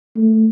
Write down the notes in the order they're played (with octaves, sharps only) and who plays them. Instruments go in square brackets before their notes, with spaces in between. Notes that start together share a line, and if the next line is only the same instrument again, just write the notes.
[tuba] A3